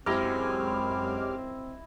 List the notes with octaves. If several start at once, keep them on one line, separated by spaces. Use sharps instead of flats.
F#2 G#3 C4 E4 G4 D#5 D6 F6